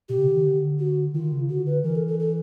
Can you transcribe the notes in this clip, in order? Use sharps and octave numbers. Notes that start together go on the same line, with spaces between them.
B2 G4
C#3
D3
D#3
D3
F#4
D#3 F4
C#3
D3 F#4
B4
E3 A#4
A4
A4
A4